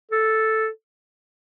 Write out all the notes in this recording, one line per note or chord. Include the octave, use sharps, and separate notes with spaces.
A4